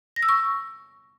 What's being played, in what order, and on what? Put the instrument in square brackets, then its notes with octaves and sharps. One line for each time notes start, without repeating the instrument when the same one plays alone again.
[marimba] A#6
E6
C#6